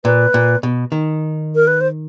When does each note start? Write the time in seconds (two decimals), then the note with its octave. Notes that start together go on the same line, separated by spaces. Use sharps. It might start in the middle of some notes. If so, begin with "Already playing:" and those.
0.04 A#2 B4
0.34 A#2
0.63 B2
0.92 D#3
1.55 A#4
1.67 B4
1.81 C5